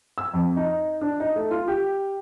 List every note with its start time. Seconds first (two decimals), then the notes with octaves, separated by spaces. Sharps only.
0.18 E6
0.33 F2
0.57 D#4
1.01 D4
1.20 D#4
1.36 A3
1.51 F4
1.68 G4